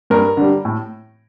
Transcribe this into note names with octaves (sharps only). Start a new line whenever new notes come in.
G2 A#4
D3 G3
A2